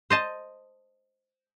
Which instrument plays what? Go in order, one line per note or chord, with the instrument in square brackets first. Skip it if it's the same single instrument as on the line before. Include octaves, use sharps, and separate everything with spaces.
[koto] C5 D#5 A5